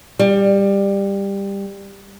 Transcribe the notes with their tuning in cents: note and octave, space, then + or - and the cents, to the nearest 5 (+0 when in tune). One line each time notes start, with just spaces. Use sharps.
G3 +15